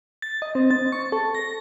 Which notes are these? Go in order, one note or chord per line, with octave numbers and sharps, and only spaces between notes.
A6
D#5
C4
A6
C#6
A4
A#6